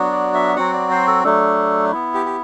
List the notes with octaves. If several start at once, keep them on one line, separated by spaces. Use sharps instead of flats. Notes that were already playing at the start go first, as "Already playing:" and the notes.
Already playing: F#3 B3 D4 F#4
D5
E5
F#3 C4 F#4 F#5
D5
C5
A4
F#3 A3 D4 A4
B3 E4
G4
G4